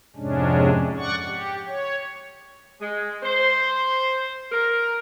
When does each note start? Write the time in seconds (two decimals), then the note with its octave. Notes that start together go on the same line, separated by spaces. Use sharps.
0.16 F2 G#2 C3 G#3 C#4 D4
0.97 D5 F#5 C#6
1.27 G4
1.67 C#5
2.81 G#3
3.23 C5
4.51 A#4